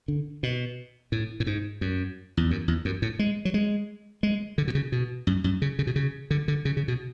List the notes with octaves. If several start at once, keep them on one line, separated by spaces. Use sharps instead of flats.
D3
B2
A2
A2
G#2
F#2
E2
F#2
E2
F#2
A2
G#3
F#3
G#3
G#3
D3
B2
C#3
B2
F#2
F#2
C#3
C#3
B2
C#3
D3
D3
C#3
C#3
B2